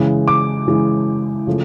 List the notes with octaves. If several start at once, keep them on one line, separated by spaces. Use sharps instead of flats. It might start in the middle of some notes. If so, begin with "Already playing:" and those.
Already playing: C#3 E3 G#3
D6
C#3 E3 G#3
C#3 F3 A3